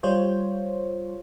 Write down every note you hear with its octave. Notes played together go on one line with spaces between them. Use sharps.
G3 F4 C5 C#5